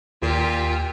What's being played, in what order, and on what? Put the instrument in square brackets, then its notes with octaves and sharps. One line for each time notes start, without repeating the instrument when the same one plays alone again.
[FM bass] D#2 [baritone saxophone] A#2 [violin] F4 G4